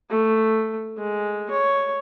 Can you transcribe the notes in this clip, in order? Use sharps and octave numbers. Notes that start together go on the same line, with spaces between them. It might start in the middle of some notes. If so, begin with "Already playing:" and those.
A3
G#3
C#5